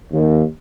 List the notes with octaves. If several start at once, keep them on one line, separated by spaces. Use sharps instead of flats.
D#2